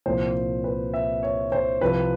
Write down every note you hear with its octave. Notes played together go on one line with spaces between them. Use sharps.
C2 A#2 F3 C5
B4
E5
C#5
C5
C2 C3 F3 B4